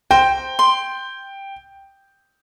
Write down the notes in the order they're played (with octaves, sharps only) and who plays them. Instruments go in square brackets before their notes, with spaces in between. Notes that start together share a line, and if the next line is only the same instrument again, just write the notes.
[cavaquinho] C5 A#5 [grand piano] G5
[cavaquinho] C6